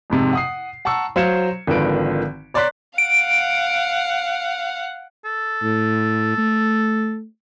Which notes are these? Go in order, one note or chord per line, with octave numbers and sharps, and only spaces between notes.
F2 G#2 C3
F#5 D#6 C7
F#5 A5 A#5 C#6 E6
F#3 C5 F5 G#6 C#7 E7
G#1 D3 D#3 F3 B4 D7
C#5 D5 A#5 C6 F#6 B6
F5 F#5 D7
A4
A2
A3